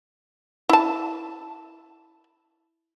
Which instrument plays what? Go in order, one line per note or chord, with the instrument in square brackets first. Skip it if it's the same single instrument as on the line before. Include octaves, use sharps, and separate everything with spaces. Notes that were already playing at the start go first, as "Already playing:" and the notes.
[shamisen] E4 A5